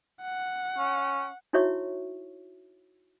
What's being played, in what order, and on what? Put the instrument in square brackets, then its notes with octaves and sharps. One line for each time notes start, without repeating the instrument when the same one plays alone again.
[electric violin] F#5
[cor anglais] C#4
[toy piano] D#4 E4 F#4 C#5 E5 C#6